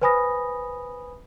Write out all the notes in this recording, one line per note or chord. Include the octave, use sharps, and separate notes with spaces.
B4 C5 G#5 B5 D#6 A#6